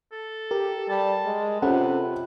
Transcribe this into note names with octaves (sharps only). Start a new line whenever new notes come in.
A4
G4 A#4
G3 A5
G#3
C3 C#4 F4 A4 B4 F#5